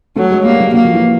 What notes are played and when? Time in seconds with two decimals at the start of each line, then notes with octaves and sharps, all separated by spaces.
0.16 F#3 A3
0.31 G#3
0.45 G3 A#3
0.60 F#3
0.74 F#3 A#3
0.85 F3
0.94 E3